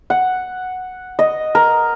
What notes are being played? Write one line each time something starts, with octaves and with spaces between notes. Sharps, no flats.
F#5
D#5
A#4